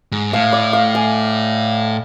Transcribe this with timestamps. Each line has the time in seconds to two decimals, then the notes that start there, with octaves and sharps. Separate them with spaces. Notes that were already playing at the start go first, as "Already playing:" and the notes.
0.12 G#2
0.33 A2 F5
0.53 D5
0.73 F5
0.95 G#5